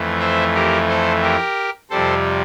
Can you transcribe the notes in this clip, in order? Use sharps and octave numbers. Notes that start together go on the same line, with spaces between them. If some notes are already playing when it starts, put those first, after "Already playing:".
Already playing: F2 E3 A3
C5 E5
G4 A#4
A4 C5
G4 A#4
F2 C3 G3 A4 C5